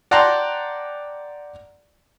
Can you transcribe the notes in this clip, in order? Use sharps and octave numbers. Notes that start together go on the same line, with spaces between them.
D5 F#5 G5 A5 A#5 C6